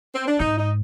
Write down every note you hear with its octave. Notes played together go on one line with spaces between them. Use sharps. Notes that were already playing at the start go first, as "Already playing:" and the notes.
C4
D4
G#2 D#4
D#4